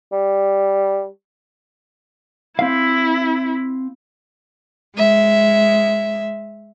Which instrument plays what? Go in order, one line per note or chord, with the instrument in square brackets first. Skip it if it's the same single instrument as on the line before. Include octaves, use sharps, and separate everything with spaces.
[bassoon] G3
[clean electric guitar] C4 F5 [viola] E4
[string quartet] G#3 E5